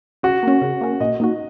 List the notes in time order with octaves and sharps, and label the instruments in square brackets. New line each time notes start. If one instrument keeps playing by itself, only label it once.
[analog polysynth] C#3 [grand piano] F#4
[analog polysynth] A#3 C#4
C#3
A#3 C#4
[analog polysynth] A#2 [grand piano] D#5
[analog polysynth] A#3 D#4 F#4